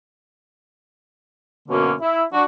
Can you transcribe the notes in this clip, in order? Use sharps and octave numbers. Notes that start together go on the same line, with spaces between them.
F#2 B2 D3 A#3 C#4
E4
D4 F#4